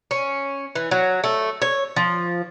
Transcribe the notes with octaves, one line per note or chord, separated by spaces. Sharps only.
C#4
E3
F#3
A3
C#5
F3